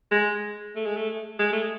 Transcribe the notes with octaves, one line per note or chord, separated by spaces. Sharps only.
G#3
A3
G#3
A3
G#3
A3